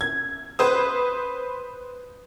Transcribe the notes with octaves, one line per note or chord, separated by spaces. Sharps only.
G#6
B4 C5 D#6